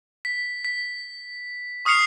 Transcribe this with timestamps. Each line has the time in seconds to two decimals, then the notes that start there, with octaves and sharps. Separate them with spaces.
0.25 B6
0.65 B6
1.85 C#6 D#6 F6 C7 C#7 F7